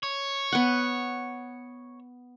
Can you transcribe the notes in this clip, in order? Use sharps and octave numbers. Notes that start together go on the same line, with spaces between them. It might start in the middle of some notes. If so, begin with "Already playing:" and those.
C#5
B3 F#5